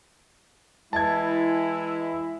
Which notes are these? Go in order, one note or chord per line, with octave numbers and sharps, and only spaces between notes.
E3 G#3 E4 A5 G#6